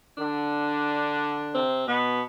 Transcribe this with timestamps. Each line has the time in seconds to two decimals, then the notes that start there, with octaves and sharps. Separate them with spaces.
0.18 D3 D4
1.54 C3 C4
1.87 B2 B3